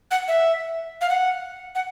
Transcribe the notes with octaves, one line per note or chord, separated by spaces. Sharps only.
F#5
E5
F5
F#5
F#5